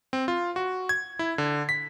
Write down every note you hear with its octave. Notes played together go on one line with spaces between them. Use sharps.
C4
F4
F#4
G#6
E4
D3
B6